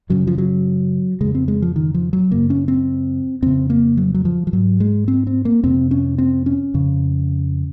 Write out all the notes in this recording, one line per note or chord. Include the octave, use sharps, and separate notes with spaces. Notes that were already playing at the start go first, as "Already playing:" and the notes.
F#2 C#3 F#3
F3
F#3
F2 C#3 G#3
C4
G#3
F3
D#3
F3
F#3
F#2 C#3 A#3
C#4
C4
F2 C#3 C4
A#3
F#3
F#3
F3
F3
G#2 F#3
G#3
C4
C4
A#3
F2 C3 C4
C#4
C4
C#4
F2 C#3